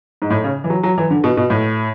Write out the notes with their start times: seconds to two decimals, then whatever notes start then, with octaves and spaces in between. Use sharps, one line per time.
0.22 G#2
0.30 A2
0.44 C#3
0.64 E3
0.70 F#3
0.83 F#3
0.98 E3
1.10 D3
1.24 B2
1.37 B2
1.50 A2